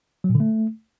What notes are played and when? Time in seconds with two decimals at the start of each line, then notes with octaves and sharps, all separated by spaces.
0.24 F#3
0.30 A#2
0.35 D3
0.40 A3